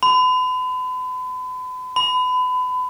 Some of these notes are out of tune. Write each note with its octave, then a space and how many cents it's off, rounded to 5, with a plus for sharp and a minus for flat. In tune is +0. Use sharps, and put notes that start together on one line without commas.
B5 +40
B5 +30